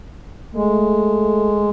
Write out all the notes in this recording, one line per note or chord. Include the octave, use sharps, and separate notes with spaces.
G#3 A3